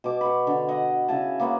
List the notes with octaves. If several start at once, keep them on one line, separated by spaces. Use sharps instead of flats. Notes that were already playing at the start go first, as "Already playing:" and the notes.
B2 D6
B5 C#6
D3
D#5 F#5
C#3 E4 G#5 A5
A#3 B3 C#5